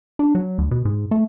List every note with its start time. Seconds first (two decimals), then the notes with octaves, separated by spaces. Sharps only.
0.19 D4
0.35 F#3
0.58 D2
0.71 B2
0.85 G#2
1.11 A3